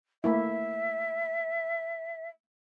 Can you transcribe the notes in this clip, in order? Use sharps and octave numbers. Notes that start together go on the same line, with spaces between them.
A3 A#3 E4 E5